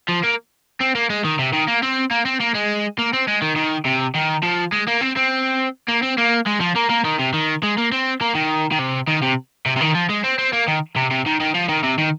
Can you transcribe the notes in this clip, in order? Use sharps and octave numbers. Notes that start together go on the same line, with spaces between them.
F3
A#3
C4
A#3
G#3
D#3
C3
D#3
A#3
C4
A#3
C4
A#3
G#3
A#3
C4
G#3
D#3
D#3
C3
D#3
F3
G#3
A#3
C4
C4
A#3
C4
A#3
G#3
F3
A#3
A#3
D#3
C3
D#3
G#3
A#3
C4
A#3
D#3
D#3
C3
D#3
C3
C3
C3
D#3
F3
G#3
C4
C4
A#3
D#3
C3
C3
D#3
D#3
F3
D#3
C3
D#3